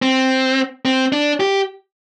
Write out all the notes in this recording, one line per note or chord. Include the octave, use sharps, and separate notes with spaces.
C4
C4
D4
G4